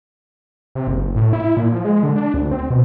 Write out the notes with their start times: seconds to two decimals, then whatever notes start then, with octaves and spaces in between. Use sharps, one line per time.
0.75 C3
0.88 F#1
1.16 A2
1.33 E4
1.57 A#2
1.72 F3
1.85 G#3
2.03 D3
2.16 D4
2.34 D2
2.51 C4
2.70 B2